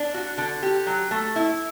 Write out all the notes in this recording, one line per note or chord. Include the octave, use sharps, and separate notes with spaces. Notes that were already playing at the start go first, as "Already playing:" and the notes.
Already playing: D4
F#4
D3
G4
F#3
A3
E4